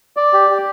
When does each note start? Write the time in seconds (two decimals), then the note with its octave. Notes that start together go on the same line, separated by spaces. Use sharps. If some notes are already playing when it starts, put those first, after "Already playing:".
0.17 D5
0.33 G4
0.50 G4